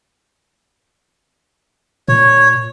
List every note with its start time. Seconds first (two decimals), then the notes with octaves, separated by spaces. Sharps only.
2.08 A#2 C#5